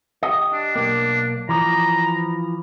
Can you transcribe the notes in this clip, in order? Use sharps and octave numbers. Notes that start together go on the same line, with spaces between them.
G4 D#5
D4
B1 A#3 D4
E3 F3 A#5